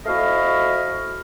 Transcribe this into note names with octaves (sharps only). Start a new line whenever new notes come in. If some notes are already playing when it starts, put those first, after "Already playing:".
F2 A3 E4 F#4 D#5 F5